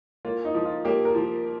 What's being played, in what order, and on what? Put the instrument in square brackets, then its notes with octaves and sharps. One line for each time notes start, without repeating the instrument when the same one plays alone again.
[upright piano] A#3 [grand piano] F4
[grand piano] D#4
[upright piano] F3
[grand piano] F4
[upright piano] A#3 [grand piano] G4
[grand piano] A#4
[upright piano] F3